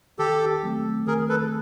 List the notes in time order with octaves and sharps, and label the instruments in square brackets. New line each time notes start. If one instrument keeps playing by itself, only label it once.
[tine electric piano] D#3 [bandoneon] G4 A4
[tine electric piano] F#3 A3 C4
[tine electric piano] D#3 [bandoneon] G#4 A#4
[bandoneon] A4 B4